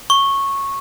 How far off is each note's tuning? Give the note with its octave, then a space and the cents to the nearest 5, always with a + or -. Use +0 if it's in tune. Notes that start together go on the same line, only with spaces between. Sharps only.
C#6 -10